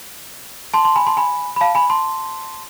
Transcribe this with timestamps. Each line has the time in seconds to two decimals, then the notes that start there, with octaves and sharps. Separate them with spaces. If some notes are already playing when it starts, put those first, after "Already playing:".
0.74 A5 C6
0.85 A5 C6
0.96 G#5 B5
1.07 A5 C6
1.17 G#5 B5
1.56 B5
1.61 F5 A5
1.75 G#5 B5
1.90 A5 C6